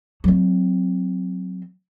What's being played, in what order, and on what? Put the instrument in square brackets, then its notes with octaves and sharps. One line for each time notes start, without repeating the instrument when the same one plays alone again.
[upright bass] F#3 C4